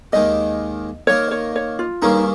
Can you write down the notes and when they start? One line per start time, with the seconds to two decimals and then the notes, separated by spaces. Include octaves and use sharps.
0.12 D#2 D#3 G#3 D#4 G4 D#5
1.07 D#3 A#3 D#4 A#4 C#5
1.31 C#5
1.56 C#5
1.79 F4
2.02 G2 D#3 A#3 C#4 D#4 G#4